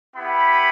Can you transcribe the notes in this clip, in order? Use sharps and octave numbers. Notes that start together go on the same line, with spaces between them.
B3 E4 G4 B5